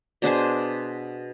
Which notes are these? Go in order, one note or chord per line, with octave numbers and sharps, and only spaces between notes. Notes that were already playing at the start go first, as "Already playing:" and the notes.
B2 D4 G#4 C5